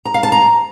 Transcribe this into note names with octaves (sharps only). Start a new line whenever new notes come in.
A#5
F5
A5
A#5